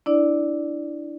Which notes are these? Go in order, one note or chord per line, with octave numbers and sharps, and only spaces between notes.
D4 E4 D5